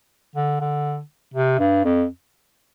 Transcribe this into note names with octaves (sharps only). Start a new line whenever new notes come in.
D3
D3
C3
G2
F2